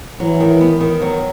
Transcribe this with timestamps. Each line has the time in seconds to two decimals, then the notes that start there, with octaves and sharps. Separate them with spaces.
0.20 E3 F#3
0.40 D#3
0.61 B3
0.81 D#3
1.01 F#3